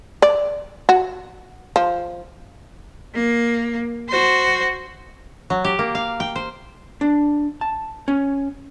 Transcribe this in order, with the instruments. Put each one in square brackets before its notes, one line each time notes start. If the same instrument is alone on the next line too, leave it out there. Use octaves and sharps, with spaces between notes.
[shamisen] D5
F#4
F3
[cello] A#3
F#4 C5
[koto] F#3
G4
A#3
F5
G5
C5
[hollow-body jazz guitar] D4
A5
C#4